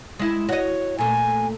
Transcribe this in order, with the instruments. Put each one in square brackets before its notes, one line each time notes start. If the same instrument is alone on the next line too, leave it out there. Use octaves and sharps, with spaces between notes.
[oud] G#3 E4
[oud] F#4 D#5 [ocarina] C#5
[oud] A#2 A3 [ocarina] G#5